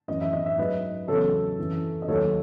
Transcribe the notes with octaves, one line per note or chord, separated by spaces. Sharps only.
F#2 E3 D#5
E5
D#5
E5
G#2 F#3 B4 D#5
E2 C#3 F#3 A4 C#5
F#2 E3
D#5
D#2 D#3 F#3 A4 C#5